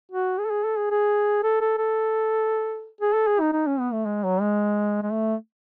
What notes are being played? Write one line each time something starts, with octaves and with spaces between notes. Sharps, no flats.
F#4
G#4
A4
G#4
A4
G#4
G#4
A4
A4
A4
G#4
A4
G#4
D#4
D#4
C#4
B3
A3
G#3
F#3
G#3
G#3
A3